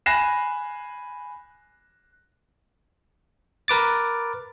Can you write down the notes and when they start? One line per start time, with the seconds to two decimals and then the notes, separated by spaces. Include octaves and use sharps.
0.06 G#5 B5 F#6 A#6 C7 E7
3.68 A#4 B4 D6 A6